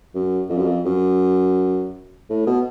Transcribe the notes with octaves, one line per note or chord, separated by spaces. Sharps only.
F#2
F2
F#2
F2
F#2
A2
B2